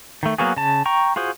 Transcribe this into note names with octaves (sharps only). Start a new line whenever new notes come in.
D#3 A3
F#3 A#3 B3 F#4 G#4
C#3 A5
G5 A#5 C#6
F4 F#4 G#4 C5